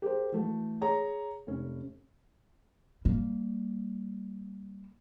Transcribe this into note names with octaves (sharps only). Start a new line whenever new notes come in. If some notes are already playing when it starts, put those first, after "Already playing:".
G4 G#4 A#4 C5
E3 A3 F#4
G#4 C#5 A#5
F1 C#4
G3 A#3